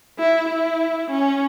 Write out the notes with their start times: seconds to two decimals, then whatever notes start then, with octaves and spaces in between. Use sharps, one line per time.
0.19 E4
0.49 E4
1.11 C#4